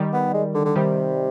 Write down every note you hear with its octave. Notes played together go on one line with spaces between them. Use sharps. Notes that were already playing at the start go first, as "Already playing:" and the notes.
Already playing: D#3 G3
B3
G#3
D3
D3
C3 D#3 G3